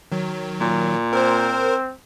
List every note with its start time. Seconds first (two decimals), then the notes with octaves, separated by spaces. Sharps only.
0.12 D#3 F#3
0.60 A#2
1.13 C4 A#4 C5